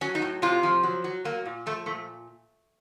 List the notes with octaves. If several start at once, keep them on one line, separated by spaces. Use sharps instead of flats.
F#3 C#4
D#4
A2
C3 F4
F3
F#3
F#3
F#3 A#3
A#2
F3 A3
A#2 A3